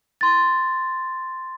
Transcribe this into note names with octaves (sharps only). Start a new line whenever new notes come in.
C6 A6